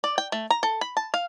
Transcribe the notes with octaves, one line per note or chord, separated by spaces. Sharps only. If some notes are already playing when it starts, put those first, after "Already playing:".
D5
G5
A3
A#5
A4
B5
A5
F5